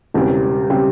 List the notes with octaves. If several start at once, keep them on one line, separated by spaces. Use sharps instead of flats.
E1 E2 C#3 G3 C4
C#3 G3 C4